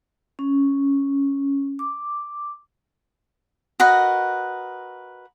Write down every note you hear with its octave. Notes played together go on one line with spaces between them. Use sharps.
C#4
D6
F#4 A#4 B4 D#5